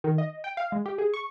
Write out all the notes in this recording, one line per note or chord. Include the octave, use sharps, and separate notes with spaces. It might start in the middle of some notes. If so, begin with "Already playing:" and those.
D#3
D#5
G5
F5
G#3
G4
G#4
C#6